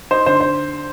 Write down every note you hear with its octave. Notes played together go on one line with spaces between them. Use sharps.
D#4 C5
D3 C5
C5